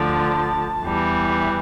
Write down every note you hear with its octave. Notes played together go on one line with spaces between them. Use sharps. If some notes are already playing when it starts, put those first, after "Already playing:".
Already playing: D2 D3 F3 A5
E2 E3 G3